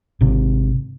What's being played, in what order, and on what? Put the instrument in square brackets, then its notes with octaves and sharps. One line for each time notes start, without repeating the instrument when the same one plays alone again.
[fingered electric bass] G#1 C3